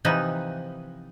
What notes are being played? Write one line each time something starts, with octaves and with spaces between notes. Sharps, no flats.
C3 E3 F3 D#4 B4